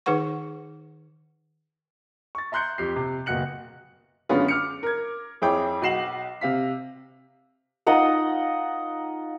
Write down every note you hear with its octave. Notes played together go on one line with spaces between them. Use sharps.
D#3 D#4 G#4 B4 F#5 C#6
C#6 A6
E5 A#5 C6 F#6 G6 C#7
F2 G4 C7
C3
F#1 B2 F#4 F#6 C#7 F#7
F#2 D3 G#3 B3 C#4 F4
D6 F6 C#7
A#4 G#6
F2 E4 G#4 C#5 G5 D6
B1 F#4 C7 E7 F#7
C3 F5 B6
D#4 F4 D#5 F#5